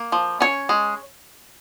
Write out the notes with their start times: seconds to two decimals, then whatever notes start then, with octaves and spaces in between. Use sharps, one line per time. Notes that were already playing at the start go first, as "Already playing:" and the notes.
Already playing: A#3
0.12 F3
0.40 C#4 C#5
0.69 G#3